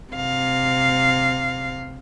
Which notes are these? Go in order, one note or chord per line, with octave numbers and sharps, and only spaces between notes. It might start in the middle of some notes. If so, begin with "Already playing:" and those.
C3 F5